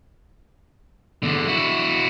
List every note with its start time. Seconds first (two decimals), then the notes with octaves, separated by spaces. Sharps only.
1.23 E2 D3
1.48 E4 F#4